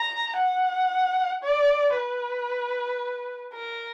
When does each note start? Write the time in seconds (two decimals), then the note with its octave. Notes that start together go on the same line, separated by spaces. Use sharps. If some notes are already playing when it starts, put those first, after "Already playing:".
Already playing: A#5
0.37 F#5
1.43 D5
1.97 B4
3.54 A#4